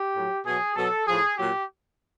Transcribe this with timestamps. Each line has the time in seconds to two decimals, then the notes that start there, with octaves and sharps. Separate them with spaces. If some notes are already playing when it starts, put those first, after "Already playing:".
Already playing: G4
0.14 A2 F#3
0.45 B2 F#3 G#4
0.76 B2 F#3 A4
1.07 A2 F3 G#4
1.37 A#2 F#3 G4